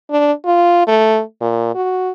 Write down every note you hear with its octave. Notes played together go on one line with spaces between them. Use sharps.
D4
F4
A3
A#2
F#4